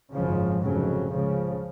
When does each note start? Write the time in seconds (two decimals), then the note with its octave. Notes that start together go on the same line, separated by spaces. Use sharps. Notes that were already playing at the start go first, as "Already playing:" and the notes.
0.12 G#1 F#2 C#3 F3
0.61 F1 F2 C#3 F#3
1.11 C#2 C#3 F3